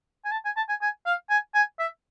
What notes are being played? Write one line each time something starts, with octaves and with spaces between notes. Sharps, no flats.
G#5
A5
G#5
A5
G#5
G#5
F5
G#5
G#5
E5